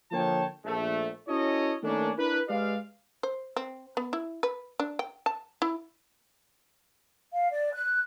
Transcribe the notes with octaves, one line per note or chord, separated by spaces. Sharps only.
D3 F3 A#3 C#5 G5 A5
A#1 A3
C#4 E4 F#4 A4 C#5 D#5
D#3 A3 A#3 C#4 D4
D4 E4 A#4 B4
G#3 G4 B4 D5 F5
C5
C4
B3
E4
B4
D4
G5
A5
E4
F5
D5
F#6